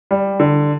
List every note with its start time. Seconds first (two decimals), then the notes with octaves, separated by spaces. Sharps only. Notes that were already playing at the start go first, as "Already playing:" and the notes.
0.11 G3
0.40 D3